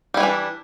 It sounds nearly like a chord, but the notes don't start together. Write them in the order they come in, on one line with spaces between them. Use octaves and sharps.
G3 E4 E3 D4